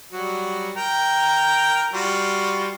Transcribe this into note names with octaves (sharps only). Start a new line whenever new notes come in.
F#3 G3 F#4
A#4 G5 A#5
G3 F4 F#4